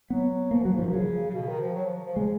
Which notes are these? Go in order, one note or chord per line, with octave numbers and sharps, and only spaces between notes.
F#3 B3
F3 A#3
B2 F#3
G#2
F3
F#2
C#3 F#3
C#3
B2
D#3
F3
F#3
F3
F3
C#3 G#3